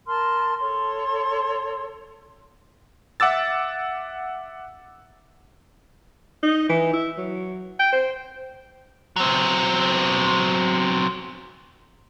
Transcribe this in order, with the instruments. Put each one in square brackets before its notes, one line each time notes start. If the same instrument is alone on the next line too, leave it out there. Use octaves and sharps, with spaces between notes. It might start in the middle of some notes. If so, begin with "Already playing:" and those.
[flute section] A#4 A5 C6 F6
A4 C#5 C6
[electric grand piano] E5 F#5 D6 E6 A6
[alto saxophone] D#4
E3
E4
F#3
G5
C5
[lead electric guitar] F#3 C4